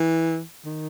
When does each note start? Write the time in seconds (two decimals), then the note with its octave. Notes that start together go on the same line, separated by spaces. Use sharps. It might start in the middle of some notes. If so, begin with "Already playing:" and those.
Already playing: E3
0.65 D#3